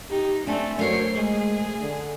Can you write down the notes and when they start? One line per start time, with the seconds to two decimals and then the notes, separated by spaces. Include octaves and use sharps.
0.11 D#4 G4
0.47 A3 C4 D4 G#5
0.79 F#3 A3 A#4 C5 C#5 C7
1.16 G#3 G#4
1.81 D3